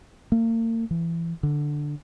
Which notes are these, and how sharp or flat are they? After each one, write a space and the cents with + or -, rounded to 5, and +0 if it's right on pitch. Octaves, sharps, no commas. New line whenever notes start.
A#3 -40
E3 +25
D3 +5